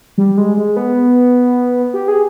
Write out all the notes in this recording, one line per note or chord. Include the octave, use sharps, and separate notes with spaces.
G3
G#3
G#3
B3
G4
G#4